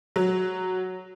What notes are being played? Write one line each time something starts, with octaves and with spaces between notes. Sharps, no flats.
F#3